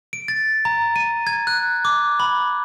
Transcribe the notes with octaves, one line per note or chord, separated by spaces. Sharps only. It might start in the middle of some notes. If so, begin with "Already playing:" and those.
D7
A6
A#5
D#7
G#6
F#6
D6
B5